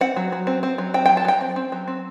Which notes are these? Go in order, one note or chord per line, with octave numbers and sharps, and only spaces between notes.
C4 F#5
F#3
F#3
C4
C4
F#3
C4 G5
F#3 G5
A5
F#3 G5
C4
C4
F#3
C4